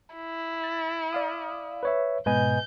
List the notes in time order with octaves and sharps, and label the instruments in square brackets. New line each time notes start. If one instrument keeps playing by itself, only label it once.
[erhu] E4
[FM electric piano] A6
D5 F5 D#6
[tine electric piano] B4 C#5 E5
[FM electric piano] G#2 B2 [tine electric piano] B4 D#5 G#5 [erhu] G6